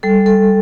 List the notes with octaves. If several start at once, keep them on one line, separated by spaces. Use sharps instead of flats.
G3 A4
G3 A4